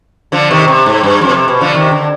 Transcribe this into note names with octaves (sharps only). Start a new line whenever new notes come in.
D3 F3
C3 D#3
C3
G#2
G2
F2
B2
C3
B2
D3 F3
C3 D#3
D3